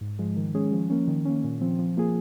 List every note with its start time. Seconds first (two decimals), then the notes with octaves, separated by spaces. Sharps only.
0.01 G#2
0.19 F3 G#3
0.36 D#3
0.55 G#3 C#4 G#4
0.72 F3
0.90 A#3 C#4
1.08 D#3
1.25 A#3 C#4
1.44 A#2
1.61 F3 C4
1.79 F3
1.97 A#3 F4 G#4